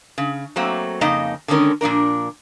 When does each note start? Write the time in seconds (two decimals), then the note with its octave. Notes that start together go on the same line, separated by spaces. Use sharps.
0.18 C#3
0.56 F#3 A3 A#3 C4
1.01 F2 C#3 A#3 D#4 D#5
1.48 D3 D#3 G#3 C#4 A#4
1.81 A#2 F3 D4 A#4